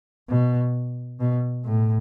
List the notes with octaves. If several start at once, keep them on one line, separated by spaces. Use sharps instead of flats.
B2
B2
A2